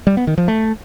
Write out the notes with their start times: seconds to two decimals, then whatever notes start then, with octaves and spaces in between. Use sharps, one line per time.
0.07 G3
0.17 B3
0.27 D#3
0.38 F3
0.48 A3